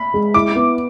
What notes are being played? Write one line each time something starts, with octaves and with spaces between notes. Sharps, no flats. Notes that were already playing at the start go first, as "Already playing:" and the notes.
Already playing: B5
G#3
E4 D6
B3